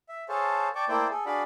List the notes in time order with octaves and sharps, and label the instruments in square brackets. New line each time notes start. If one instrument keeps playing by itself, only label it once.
[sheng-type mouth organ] E5
G#4 A4 C5 C#5 F5 A5
D5 G5 A5 C#6 D6
A3 A#3 E4 C5 D5 G5
G#4 A4
D4 F#4 G#4 D5 F5 B5